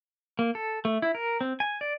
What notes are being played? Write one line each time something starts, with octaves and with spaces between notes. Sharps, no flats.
A#3
A4
A3
E4
A#4
C4
G#5
D5